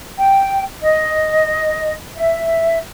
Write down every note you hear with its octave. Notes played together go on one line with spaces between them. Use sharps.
G5
D#5
E5